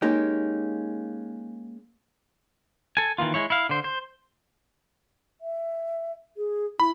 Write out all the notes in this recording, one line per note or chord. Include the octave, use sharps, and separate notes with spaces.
G#3 A#3 C#4 D#4 G4
A4 G#5
D#3 E3 A#3 F4
G#3 E4 C#5
E4 F5
D3 C5
C5
E5
G#4
E4 B5